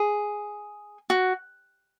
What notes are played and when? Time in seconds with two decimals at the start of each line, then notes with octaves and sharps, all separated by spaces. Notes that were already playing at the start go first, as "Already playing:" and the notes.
Already playing: G#4
1.10 F#4